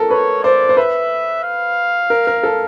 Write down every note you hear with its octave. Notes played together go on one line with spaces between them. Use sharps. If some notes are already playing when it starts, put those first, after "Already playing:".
Already playing: F4 A4 A#4
B4 C#5
C5 D5
C5
B4 E5
F5
A#4
A#4
A4